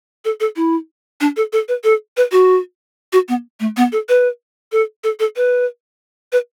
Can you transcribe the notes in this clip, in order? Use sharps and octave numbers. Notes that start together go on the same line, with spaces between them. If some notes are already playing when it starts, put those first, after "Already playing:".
A4
A4
E4
D4
A4
A4
B4
A4
B4
F#4
F#4
B3
A3
B3
A4
B4
A4
A4
A4
B4
B4